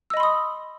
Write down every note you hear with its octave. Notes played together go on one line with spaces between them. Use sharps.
D#5 B5 C6 D#6 E6